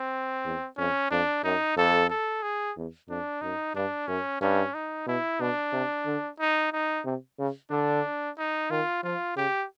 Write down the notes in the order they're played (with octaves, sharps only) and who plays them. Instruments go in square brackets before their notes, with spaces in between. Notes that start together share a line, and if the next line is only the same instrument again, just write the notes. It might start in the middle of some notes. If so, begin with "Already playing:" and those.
Already playing: [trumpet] C4
[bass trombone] E2
[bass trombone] F2 [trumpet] C#4
[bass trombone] F2 [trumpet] D4
[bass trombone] F#2 [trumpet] D#4
[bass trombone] F2 [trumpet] A4
[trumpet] A4
G#4
[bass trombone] E2
[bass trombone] F2 [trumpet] D4
[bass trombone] F#2 [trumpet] D#4
[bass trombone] G2 [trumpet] D4
[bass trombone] F#2 [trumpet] C#4
[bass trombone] G2 [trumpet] C#4
[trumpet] D#4
[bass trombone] B2 [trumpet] E4
[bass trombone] B2 [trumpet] D4
[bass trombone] C3
D3
[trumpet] D#4
D#4
[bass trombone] C3
C#3
[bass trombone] D3 [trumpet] D4
[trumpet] D#4
[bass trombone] D#3 [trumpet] F4
[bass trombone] F3 [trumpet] F4
[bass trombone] C#3 [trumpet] G4